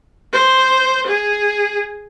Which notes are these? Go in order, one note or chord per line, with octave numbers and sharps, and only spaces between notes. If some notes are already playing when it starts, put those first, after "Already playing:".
C5
G#4